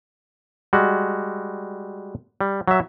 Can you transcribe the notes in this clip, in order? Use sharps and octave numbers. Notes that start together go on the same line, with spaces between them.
G3 G#3 F#4
G3
F#3 E5